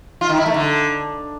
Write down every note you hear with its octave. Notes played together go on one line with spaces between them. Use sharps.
F4
D#3
E4
A3
D3